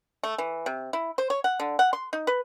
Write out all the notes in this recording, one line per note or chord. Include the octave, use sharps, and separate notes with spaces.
A3
E3
C3
E4
C5
C#5
F#5
D3
F#5
C6
D#4
B4